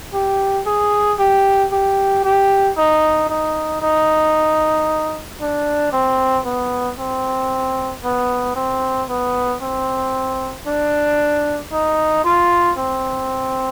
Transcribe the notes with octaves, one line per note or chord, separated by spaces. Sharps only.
G4
G#4
G4
G4
G4
D#4
D#4
D#4
D4
C4
B3
C4
B3
C4
B3
C4
D4
D#4
F4
C4